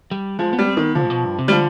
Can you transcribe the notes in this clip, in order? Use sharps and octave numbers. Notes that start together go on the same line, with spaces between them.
G3
F3 G#3
B3
G3
C4
D#3
B3
D3 F3
G#2
B2
G2
C3
D#3 G3
D3 F3